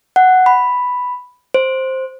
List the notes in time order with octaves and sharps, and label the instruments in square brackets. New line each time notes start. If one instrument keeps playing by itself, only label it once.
[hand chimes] F#5
B5
C5